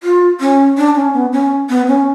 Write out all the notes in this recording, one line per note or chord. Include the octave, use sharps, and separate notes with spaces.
F4
C#4
D4
C#4
B3
C#4
B3
C#4